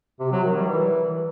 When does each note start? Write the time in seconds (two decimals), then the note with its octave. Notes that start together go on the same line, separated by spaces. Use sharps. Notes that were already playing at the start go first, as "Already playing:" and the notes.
0.20 C3
0.32 F#3
0.44 D#3
0.56 G3
0.68 E3